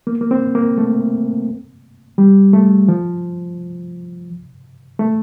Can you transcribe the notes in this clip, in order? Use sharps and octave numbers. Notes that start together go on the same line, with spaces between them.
A#3
A#3
C4
A#3
A3
G3
A3
F3
A3